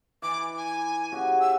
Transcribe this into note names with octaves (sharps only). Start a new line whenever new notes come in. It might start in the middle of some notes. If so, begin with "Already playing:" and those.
E3 D6
G#5
C#3 F#4 G4
E6